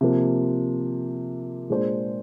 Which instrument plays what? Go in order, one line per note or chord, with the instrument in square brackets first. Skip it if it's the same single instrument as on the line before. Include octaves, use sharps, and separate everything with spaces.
[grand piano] C3 F3 A#3
A#2 G#3 D4 F4 C5